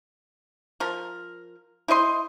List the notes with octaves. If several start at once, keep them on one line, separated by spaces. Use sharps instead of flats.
F3 A#4
E4 C5 D#5 C6